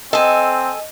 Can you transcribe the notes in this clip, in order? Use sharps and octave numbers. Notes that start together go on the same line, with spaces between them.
C4 A4 D#5 G#5